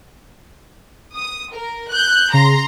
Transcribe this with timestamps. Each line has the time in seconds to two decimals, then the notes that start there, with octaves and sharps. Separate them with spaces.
1.14 D#6
1.54 A#4
1.91 F#6 G6
2.33 C#3 A#5 C6